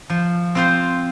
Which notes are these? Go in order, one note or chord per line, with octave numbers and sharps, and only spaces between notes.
F3
C4 F4 C5